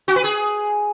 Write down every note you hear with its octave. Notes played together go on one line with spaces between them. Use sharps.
F#4
B4
G#4